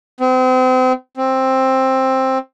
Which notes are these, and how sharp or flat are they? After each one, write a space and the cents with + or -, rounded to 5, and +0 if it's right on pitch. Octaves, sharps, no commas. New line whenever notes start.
C4 -35
C4 +10